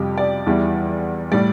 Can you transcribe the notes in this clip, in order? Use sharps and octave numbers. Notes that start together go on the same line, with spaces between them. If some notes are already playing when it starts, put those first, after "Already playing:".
Already playing: F2 C3 G3 G4
D5
E2 E3 G3
A2 G3 D5